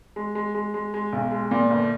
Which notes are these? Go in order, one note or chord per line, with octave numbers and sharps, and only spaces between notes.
G#3
G#3
G#3
G#3
G#3
B1
G#3
A#2
G1